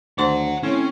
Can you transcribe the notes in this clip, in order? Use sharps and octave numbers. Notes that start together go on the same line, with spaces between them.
D2 D#3 C5 C#5 F#5 C6
A2 C4 C#4